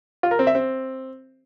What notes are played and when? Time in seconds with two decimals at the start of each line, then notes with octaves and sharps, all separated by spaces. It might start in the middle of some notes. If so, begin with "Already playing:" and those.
0.23 F4
0.31 A#4
0.39 C4
0.47 E5
0.55 C4